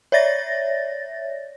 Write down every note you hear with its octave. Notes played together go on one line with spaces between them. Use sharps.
C#5 D5 E5 A6 A#6